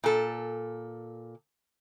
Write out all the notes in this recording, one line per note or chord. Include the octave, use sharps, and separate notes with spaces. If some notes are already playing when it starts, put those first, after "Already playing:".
A#2 A4